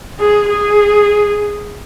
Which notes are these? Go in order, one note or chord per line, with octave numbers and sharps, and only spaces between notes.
G#4
G#4